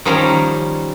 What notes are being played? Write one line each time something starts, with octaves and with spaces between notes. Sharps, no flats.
D#3 F3 G3 C#4 A#5